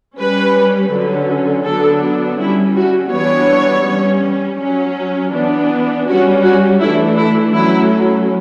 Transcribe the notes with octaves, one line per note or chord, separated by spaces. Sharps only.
G3 C#4 B4
D3 F#3 C#4
D3 F#3 B3 D4 A4
G3 C#4 E4
F#4
E3 G3 B3 D4 C#5
G3 C#4
F#3 C#4
E3 B3 D4
G3 C#4 F#4
F#4
E3 A3 D4 E4
E4
F#3 A3 C#4 E4